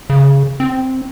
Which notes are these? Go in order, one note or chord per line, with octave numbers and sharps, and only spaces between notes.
C#3
C4